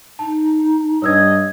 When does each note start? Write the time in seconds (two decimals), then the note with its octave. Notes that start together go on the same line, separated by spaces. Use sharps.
0.19 D#4 A5
1.02 G2 C#5 D#5 E6 G#6